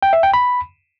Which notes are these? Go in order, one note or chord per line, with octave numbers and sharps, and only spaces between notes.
G5
E5
G5
B5